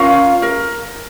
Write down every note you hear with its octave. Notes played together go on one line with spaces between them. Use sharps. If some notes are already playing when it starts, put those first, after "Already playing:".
Already playing: C#4 F4 A#4 F5
A#4